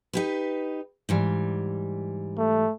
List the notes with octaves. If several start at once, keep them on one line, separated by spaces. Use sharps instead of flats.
D#4 G4 B4
G#2 E3 G3
A3